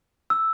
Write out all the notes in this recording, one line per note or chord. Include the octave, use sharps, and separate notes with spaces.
E6